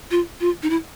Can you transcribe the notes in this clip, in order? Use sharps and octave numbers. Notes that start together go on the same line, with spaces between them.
F4
F4
D#4
E4